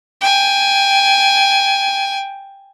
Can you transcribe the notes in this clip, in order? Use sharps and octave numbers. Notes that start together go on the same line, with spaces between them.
G5 G#5